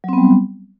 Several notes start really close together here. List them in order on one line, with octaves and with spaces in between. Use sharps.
F#3 C4 B3 G3